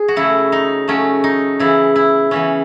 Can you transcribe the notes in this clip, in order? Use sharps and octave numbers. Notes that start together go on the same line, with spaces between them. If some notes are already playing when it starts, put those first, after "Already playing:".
Already playing: G#4
F#4
C#3 F#3 A3 E4
D#4
C#3 F#3 A3 C#4
D#4
C#3 E3 B3 E4
E4
C#3 E3 B3 C#4